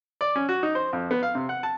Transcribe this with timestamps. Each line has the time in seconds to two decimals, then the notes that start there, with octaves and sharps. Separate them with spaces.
0.21 D5
0.36 C#4
0.49 F#4
0.63 D#4
0.75 C5
0.93 F2
1.11 B3
1.23 F5
1.35 C3
1.49 F#5
1.63 A5